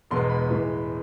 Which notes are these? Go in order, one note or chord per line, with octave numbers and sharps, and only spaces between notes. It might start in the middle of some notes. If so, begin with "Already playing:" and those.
E1 E2 B2 G#3 C6
B5
A2 E3 G#3